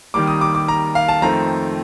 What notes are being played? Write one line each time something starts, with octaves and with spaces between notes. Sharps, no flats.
D#2 D#3 G3 A#3 D6
D#6
D6
D6
A#5
F5
A5
F2 D#3 A3 C4 A#5